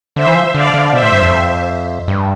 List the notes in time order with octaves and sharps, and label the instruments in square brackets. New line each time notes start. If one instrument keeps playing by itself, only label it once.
[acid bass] D3 [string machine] C5 E5
[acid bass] E3
F3
[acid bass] D3 [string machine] D5 F5
[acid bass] D3
[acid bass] B2 [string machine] C5 E5
[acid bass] A2
G2
F2
G2